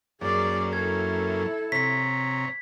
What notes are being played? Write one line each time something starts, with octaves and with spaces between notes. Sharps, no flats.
F#2 A#3 C#4 G#4 D5
E4 A4 G#6
C3 C#5 A#5 B6